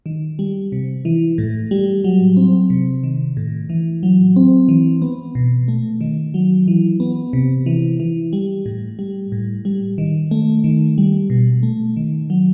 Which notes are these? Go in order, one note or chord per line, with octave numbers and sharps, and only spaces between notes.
D#3
G3
C3
E3
A2
G3
F#3
C4
C3
D#3
A2
E3
F#3
C4
E3
B3
B2
A3
D#3
F#3
E3
B3
C3
E3
E3
G3
A2
G3
A2
G3
D#3
A3
D#3
G3
B2
A3
D#3
F#3